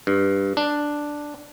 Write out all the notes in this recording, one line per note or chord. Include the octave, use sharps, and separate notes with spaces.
G2
D4